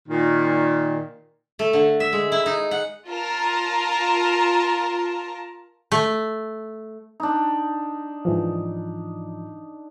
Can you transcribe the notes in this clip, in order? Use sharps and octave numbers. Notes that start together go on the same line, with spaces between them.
A#2 D#3
A3
D3
E5
G#3
E4
D#4
F#5
F4 A#4 A5 A#5
A3
D4 D#4
G#2 E3 F3